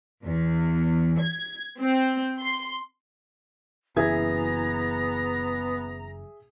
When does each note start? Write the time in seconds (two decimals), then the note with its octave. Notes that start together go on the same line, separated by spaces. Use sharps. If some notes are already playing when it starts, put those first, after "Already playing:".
0.23 E2
1.20 G#6
1.79 C4
2.40 C6
3.96 F#1 E3 B3 G#4 E5 A#5 G#6